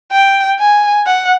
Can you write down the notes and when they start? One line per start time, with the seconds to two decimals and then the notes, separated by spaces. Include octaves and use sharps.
0.11 G5
0.59 G#5
1.06 F#5